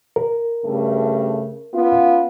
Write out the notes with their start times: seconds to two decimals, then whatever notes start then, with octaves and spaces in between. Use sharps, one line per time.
0.16 A#4
0.64 G2 C#3 A3
1.74 B3 C#4 F4